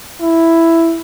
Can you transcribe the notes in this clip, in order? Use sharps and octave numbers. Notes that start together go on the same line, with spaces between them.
E4